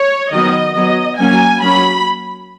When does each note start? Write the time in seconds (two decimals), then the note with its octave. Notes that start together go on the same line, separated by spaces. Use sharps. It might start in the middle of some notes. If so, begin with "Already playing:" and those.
Already playing: C#5
0.32 D#3 F#3 B3 D#5
0.75 F#3 B3 D#5
1.18 F#3 A#3 C#4 G#5
1.62 F#3 A#3 C#4 B5